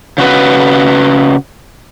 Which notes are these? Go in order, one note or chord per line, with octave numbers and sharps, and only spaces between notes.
C#3 F#4 B4